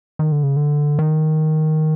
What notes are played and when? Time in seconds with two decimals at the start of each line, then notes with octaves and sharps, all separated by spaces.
0.19 D#3
0.32 D3
0.43 C#3
0.57 D3
0.99 D#3